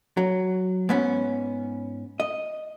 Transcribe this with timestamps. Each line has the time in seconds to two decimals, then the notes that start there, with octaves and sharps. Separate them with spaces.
0.17 F#3
0.89 G#2 B3 C#4
2.20 D#5